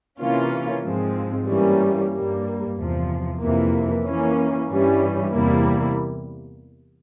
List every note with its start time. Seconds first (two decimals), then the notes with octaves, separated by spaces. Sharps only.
0.19 C3 E3 A#3 C#4 F4
0.84 G#2 F3 G#3 C4
1.48 G2 E3 G3 A#3 C#4
2.13 G2 G3 A#3
2.76 E2 C3 F3
3.41 F2 C3 E3 A#3
4.05 E3 A#3 C#4
4.69 G2 E3 G3 C#4
5.34 E2 C3 G3 A#3 E4